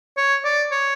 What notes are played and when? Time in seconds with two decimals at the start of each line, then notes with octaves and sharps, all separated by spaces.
0.17 C#5
0.45 D5
0.71 C#5